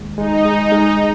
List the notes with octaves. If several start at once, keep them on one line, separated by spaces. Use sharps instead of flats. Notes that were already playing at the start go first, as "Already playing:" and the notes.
Already playing: D#2 G#3
G#3 D#4
G#3
G#3